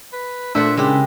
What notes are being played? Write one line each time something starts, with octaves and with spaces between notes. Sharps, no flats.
B4
A#2 A3 D4 C5 E5 F#5
C#3 G#3 E4 G4